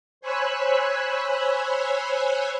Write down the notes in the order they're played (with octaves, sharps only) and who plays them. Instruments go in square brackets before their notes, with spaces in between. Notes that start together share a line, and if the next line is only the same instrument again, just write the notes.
[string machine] C5 C#5 G#5 B5 E6 F#6